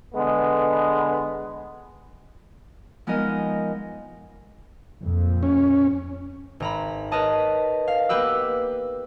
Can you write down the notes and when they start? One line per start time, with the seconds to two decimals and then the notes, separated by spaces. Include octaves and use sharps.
0.14 D3 G#3 B3
3.07 F3 G#3 B3 D#4 A#4 D#5
4.99 F2 A#2
5.43 C#4
6.60 G#1 A#5 B5
7.12 A#4 B4 C#5 D#5 A5
7.88 F5
8.09 A#3 B3 G4 B4 E6